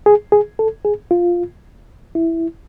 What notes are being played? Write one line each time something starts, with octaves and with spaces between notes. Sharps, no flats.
G#4
G#4
A4
G#4
F4
E4